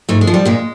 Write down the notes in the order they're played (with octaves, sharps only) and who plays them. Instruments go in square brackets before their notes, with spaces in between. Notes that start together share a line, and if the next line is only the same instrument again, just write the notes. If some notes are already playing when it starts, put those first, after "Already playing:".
[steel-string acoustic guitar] G#2 A3
G#3
F3
G3
A#2 G#3